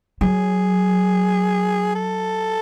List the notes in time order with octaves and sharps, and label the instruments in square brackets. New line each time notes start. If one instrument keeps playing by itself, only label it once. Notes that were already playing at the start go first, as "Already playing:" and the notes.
[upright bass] F#3 [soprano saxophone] G#4
[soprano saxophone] A4